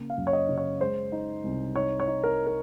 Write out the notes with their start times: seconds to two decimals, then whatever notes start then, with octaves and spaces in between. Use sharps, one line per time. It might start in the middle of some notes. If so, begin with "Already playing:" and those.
Already playing: C#3 A#3
0.10 F5
0.17 F#2
0.27 C#5
0.33 D#5
0.49 C#3
0.58 C#5
0.80 G#3 C5
1.12 D#4
1.44 C2
1.76 D#4 C#5
2.00 C#5
2.08 D#4
2.24 A#4
2.47 A#4